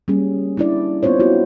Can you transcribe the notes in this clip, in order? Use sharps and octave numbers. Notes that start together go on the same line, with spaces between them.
G3 A#3 C#4 G#4
D4 E4 D5
B3 C4 F4 C5 C#5
B3 E4 F#4